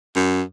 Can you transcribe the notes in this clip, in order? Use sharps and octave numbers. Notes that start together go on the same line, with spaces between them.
F#2